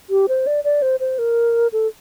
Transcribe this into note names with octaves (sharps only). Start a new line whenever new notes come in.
G4
C5
D5
D5
C5
C5
A#4
A4